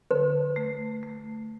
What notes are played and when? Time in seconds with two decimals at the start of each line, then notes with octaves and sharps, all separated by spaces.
0.11 D3 B4
0.56 A3
1.03 A3